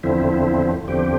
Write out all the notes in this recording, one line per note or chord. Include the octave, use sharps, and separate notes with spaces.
E2 D3 F3 C4 E4
E2 D3 F3 C4 G4